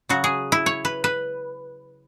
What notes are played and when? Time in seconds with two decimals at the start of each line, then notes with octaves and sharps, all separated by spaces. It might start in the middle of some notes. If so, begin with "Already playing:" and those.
0.09 C#3 F#3 F#4
0.24 G#4
0.52 E4
0.66 C#5
0.85 B4
1.04 B4